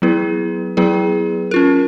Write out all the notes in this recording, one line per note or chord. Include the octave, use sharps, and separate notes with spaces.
F#3 B3 E4 G#4 B4
F#3 B3 E4 G#4 B4
C#4 F4 A#4